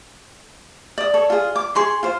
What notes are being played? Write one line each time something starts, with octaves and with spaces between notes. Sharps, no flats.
D5 D#6
A4 C#5
F4 G#4
D6
G#4 C6 C#6
F4 C5